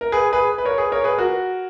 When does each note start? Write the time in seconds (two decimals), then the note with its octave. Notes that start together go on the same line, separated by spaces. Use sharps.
0.01 A#4
0.12 G#4 B4
0.33 G#4 B4
0.58 B4
0.65 A#4 C#5
0.78 G#4 B4
0.92 A#4 C#5
1.04 G#4 B4
1.18 F#4 A#4